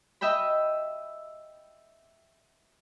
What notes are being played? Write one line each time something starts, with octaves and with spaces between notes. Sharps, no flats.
D#5 E5 G5 B5